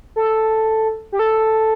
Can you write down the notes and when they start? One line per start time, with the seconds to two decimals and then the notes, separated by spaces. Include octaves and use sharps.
0.16 A4
1.12 G4
1.19 A4